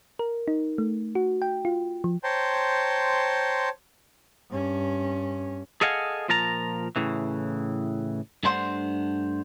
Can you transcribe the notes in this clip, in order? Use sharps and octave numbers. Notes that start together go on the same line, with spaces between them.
A#4
D#4
A3
F#4
G5
F4
F3
C5 C#5 G5 A5 A#5 C6
G2 C#4
G#4 A4 D#5 F5 F#5 G#5
A#2 F3 A#4 A5 A#5
A2 C#3 E3
G2 A3 D4 C5 F#5 C6